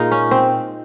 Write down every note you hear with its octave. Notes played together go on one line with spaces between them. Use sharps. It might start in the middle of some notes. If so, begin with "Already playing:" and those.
Already playing: A#2 G#3 D#4 F4
C#4
C4